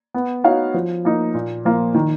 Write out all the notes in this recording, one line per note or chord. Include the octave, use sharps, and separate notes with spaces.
B3
D#4 F#4 C#5 F5
F3
A#3 D#4
A#2
F3 A#3 F4
D#3